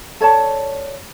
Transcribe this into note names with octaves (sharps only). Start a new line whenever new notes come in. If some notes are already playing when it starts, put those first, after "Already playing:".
A4 C#5 D5 A5